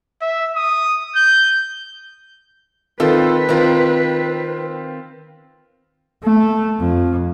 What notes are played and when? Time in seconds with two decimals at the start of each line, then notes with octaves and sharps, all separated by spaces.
0.22 E5
0.56 D#6
1.16 G6
3.00 D#3 C4 F4 A4 B4
3.49 D#3 C4 F4 A#4
6.23 A3
6.79 F2